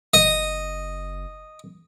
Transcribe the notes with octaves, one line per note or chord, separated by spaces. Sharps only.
F#1 D#5